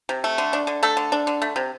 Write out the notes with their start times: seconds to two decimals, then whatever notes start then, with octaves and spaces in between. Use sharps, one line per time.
0.09 C3
0.24 A3
0.38 D3
0.53 D4
0.67 D3
0.83 A3 A4
0.97 D3
1.12 D4
1.27 D3
1.42 A3
1.56 C3